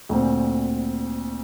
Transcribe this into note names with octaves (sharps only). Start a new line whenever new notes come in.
D2 A#2 C4